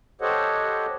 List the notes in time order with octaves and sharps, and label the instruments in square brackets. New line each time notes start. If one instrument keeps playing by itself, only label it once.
[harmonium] G4 A4 C5 C#5 D#5 F#5